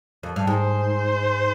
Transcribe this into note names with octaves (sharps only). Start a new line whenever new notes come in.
F2
G2
G#2 C5